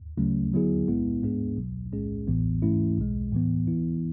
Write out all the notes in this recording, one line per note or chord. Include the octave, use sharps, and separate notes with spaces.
D2 C#3 F#3 A3 C#4
D3 F#3 B3 E4 G#4
B1 A2 G#3 B3 E4
G#2 G#3 B3 D4 G#4
B1 B2 F#3
B1 A2 G#3 C#4 G#4
A1 A2 E3 B3
G#2 E3 A3 C#4 E4
B1 B2 G#3
A2 E3 B3
E3 B3 E4